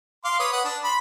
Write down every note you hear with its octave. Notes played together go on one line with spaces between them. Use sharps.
F5 C6 D6
B4 C#5 D#6
B4 F#5 D#6
D4
B5 C6